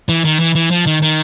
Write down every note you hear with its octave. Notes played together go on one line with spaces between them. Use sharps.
E3
D#3
E3
E3
F3
D#3
D#3